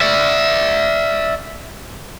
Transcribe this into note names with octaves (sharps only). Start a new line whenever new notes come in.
D5 E5